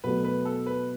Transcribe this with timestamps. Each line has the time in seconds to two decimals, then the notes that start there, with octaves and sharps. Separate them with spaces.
0.04 B2 F#3 A3 B4
0.24 B4
0.45 A4
0.66 B4